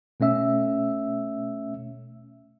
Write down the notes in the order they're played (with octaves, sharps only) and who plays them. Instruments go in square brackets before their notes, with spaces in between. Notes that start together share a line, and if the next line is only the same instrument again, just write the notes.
[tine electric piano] B2 A3 C#4 E5 E6